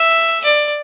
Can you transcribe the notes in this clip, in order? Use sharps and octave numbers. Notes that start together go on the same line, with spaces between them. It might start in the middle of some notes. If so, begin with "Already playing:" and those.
Already playing: E5
D5